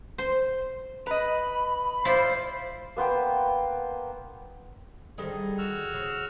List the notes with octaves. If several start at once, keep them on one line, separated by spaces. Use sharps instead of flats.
C5
B4 D#5 A#5 B5
E4 F4 C5 D5
A#3 B3 C5 G5
D3 D#3 G3 G#4
F#4 E6 F6
C#3